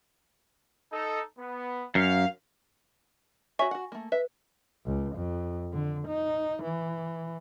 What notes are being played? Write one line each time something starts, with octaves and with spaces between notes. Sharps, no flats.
D#4 A4
B3
F#2 F5
F#4 C#5 E5 G#5 C#6
F#4 F#5
A3 A#3
B4 E5
C#2
F2
D3
D#4
E3